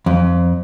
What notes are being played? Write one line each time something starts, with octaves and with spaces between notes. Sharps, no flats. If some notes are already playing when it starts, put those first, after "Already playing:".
F2